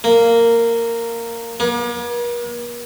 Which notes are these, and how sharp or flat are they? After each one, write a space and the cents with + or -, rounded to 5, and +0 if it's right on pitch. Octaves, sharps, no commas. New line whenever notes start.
A#3 -10
A#3 +45